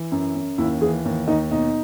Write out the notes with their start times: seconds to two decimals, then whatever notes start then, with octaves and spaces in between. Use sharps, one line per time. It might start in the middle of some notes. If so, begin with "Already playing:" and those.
Already playing: E3
0.12 F#2
0.35 F#2
0.58 D#2 E4
0.81 E3 G#4
1.05 D#2
1.27 D#2 D#4
1.50 B2 D#4